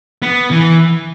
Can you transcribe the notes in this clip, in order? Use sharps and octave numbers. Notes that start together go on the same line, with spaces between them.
B3
E3